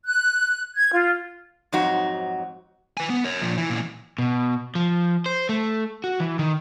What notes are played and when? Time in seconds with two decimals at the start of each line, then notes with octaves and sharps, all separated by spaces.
0.05 F#6
0.76 G#6
0.92 F4
1.72 F2 G#2 F#3 D#4 F#4
2.97 B4 G#5
3.10 B3
3.24 A#4 C#5
3.42 A#2 F3
3.57 E3
3.69 A#2 E3
4.18 B2
4.75 F3
5.26 C5
5.49 A3
6.04 F#4
6.20 E3
6.39 D#3